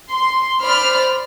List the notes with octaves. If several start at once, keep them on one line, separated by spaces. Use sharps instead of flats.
C6
C5 D5 B5 F6